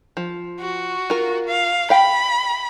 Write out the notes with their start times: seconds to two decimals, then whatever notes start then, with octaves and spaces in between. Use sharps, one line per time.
0.17 F3
0.60 F#4
1.10 F4 A#4
1.48 F5
1.90 F5 G5 B5